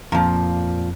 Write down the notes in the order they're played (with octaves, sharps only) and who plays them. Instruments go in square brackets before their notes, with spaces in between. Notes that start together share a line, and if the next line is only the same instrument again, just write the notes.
[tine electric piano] F2 [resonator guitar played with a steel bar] A#2 F3